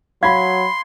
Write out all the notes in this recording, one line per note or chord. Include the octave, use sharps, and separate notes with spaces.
F#3 F5 B5 C6 G#6